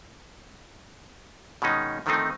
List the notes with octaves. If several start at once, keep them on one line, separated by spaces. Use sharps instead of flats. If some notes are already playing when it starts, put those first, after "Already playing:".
B2 D#3 G#3 C#4 D#4
D3 D#3 F3 A3 C4 D#4